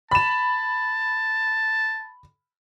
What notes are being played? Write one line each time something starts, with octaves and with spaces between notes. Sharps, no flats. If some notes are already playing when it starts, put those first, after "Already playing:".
A5 B5 E7